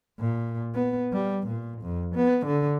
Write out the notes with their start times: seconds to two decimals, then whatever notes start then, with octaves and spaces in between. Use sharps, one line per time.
0.19 A#2
0.74 B3
1.13 G3
1.47 A#2
1.82 F2
2.15 B3
2.46 D3